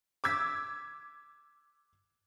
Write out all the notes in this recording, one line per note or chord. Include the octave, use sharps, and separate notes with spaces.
D6 E6 G#6 B6